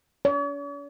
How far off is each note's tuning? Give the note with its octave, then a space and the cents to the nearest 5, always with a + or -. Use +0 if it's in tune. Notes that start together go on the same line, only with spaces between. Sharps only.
C#5 +45